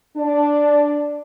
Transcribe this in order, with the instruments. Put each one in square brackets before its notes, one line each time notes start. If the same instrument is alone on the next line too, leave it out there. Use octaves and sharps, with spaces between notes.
[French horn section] D4